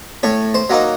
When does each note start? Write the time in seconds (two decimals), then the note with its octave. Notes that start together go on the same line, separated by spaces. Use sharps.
0.23 A2 C#5
0.54 C5
0.70 F#3 A#3 D#4